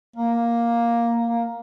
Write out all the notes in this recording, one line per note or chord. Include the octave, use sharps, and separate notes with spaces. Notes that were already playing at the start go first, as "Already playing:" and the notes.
A#3
A#3